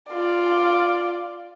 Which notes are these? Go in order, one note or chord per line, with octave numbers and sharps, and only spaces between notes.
F4 D5